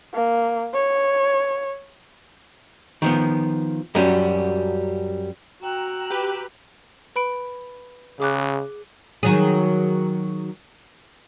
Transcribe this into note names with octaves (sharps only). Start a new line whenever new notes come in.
A#3
C#5
D#3 F3 B3
F#2 F#3 G3 C#4
F#4 G5 A#5 E6 F#6
G4 B4
B4 B5 D7
C#3 G#4 D6 F#6
D#3 F#3 G#4